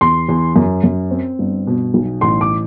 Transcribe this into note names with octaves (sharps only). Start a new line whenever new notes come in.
E2 C6
E2
F#2
F#2
C4
G1
B2
B1
A1 C6
D6